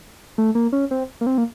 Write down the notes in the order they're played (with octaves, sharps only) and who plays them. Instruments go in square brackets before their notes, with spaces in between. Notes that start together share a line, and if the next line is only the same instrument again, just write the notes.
[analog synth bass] A3
A#3
C#4
C4
A#3
C4
A#3